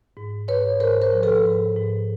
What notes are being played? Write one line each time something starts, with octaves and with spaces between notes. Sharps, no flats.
G#2
G#2 B4 C#5
G#2 A#4 C5
A#4 C5
F3
A4 B4
G#2
G#2